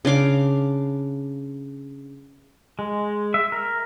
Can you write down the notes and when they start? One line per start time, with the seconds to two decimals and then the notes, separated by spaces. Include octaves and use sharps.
0.05 C#3 D4 F5 D6
2.79 G#3
3.34 E5
3.52 A#4